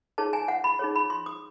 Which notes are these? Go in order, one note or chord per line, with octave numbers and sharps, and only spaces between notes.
D#4 G#4 C#5 A5
G#5
F#5
B5
D#4 G#4 C#5
B5
C6
D#6